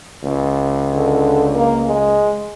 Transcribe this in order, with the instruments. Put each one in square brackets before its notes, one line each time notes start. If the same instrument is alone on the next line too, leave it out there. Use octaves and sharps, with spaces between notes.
[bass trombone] C#2
[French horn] D3
A#3
G#3